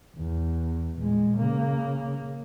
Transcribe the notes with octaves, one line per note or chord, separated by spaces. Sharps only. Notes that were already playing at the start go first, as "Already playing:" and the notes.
E2
A#2 G#3
C#3 A#3